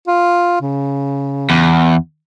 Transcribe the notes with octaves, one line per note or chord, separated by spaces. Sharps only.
F4
C#3
E2